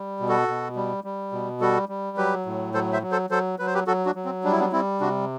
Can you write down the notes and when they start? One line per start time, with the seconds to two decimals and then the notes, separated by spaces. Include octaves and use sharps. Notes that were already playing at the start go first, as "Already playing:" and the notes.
Already playing: G3
0.20 B2
0.29 F#4 A4
0.48 B2
0.76 G3
1.04 G3
1.32 B2
1.61 G3 F#4 A4
1.89 G3
2.17 F#3 G4 B4
2.46 A2
2.74 F#3 A4 C5
2.93 C5 E5
3.02 F#3
3.11 A4 C5
3.30 F#3 A4 C5
3.59 F#3 B4
3.66 C5
3.74 G4 B4
3.87 F#3 F#4 A4
4.05 D4 F#4
4.15 F#3
4.25 C4
4.44 G3 D4
4.52 E4
4.60 B3 D4
4.72 G3 C4 E4
5.00 C3 D4 F#4